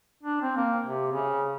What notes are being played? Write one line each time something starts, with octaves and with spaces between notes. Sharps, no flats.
D4
C4
A#3
C3
C#3